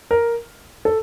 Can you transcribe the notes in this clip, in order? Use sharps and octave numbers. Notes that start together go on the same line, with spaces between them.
A#4
A4